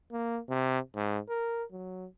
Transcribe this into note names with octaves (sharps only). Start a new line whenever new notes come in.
A#3
C3
G#2
A#4
F#3